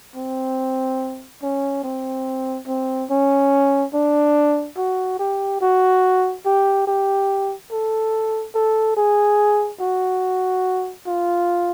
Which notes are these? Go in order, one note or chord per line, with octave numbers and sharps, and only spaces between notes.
C4
C#4
C4
C4
C#4
D4
F#4
G4
F#4
G4
G4
A4
A4
G#4
F#4
F4